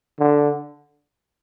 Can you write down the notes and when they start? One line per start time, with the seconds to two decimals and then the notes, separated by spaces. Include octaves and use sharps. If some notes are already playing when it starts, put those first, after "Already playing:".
0.20 D3